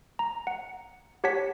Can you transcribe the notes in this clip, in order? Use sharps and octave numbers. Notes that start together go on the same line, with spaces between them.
A#5
F#5
G4 C#5 F#5 A5 B6